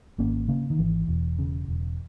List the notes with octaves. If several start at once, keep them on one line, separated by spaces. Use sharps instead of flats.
G#1 A#3 C#4
C#3 A#3 C#4
D#3
G#1 E3
E1
C#3
E1